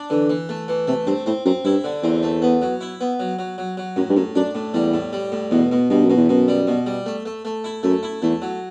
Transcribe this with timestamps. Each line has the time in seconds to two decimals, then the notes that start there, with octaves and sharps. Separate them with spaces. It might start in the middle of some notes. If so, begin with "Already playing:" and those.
Already playing: D4
0.10 D3 E3
0.30 E3
0.49 A3
0.68 E3
0.87 C3 A3
1.07 G2 C4
1.26 A2 C4
1.45 F#2 C4
1.65 G2 E4
1.84 D3
2.03 E2 C4
2.23 A3
2.42 B3
2.62 F#3
2.81 E4
3.01 B3
3.20 F#3
3.39 F#3
3.58 F#3
3.77 F#3
3.96 F#2 A2
4.09 G2
4.17 F#2 A2
4.36 F#2 D4
4.55 A2
4.74 E2 G3
4.94 A2
5.13 G3
5.32 A2
5.51 E2 B2
5.71 B2
5.90 G2 B2
6.04 F#2
6.10 B2
6.17 E2
6.29 F#2 B2
6.48 G3
6.67 B2
6.86 G3
7.06 A3
7.25 A3
7.45 A3
7.64 E4
7.83 F#2 A3
8.03 E4
8.22 E2 A3
8.42 F#3